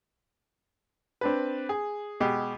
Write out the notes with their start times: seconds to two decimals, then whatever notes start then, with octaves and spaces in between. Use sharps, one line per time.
1.21 C4 D4 B4
1.69 G#4
2.20 B2 G#3 G4